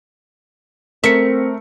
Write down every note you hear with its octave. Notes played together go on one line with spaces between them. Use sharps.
A3 C4 A#4 E5 C#7